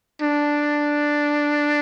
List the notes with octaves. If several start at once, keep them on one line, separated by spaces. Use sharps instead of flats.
D4